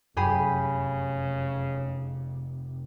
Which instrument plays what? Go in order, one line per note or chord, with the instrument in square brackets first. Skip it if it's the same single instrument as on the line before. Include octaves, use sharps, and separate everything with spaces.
[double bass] F1 [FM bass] F#2 [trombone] C#3 [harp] G4 G#4 B5